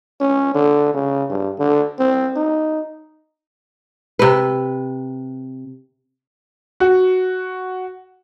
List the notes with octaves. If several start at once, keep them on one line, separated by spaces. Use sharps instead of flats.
C#4
D3
C#3
G2
D3
C4
D#4
C3 B4
F#4